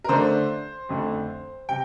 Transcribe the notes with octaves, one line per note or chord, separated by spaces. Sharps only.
A#4
D3 A3 D4 C5
F2 D3 A3
C3 G5